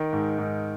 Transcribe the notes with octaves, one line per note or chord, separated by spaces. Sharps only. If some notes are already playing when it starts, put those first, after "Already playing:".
Already playing: D#3
G#2
G#2